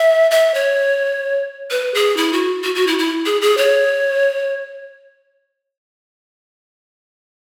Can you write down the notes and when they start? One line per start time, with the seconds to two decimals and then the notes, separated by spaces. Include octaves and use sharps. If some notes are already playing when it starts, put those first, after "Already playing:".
Already playing: E5
0.31 E5
0.54 C#5
1.71 B4
1.94 G#4
2.17 E4
2.33 F#4
2.64 F#4
2.75 F#4
2.87 E4
2.99 E4
3.26 G#4
3.41 G#4
3.57 C#5